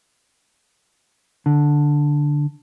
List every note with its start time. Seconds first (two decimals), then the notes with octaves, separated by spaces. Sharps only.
1.46 D3